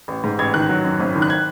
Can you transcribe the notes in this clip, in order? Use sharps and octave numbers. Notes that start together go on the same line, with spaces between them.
A1
G#2
A1 G#6
D#3 F#6
F#3
F#2
G#1
D#3
F#6
G#6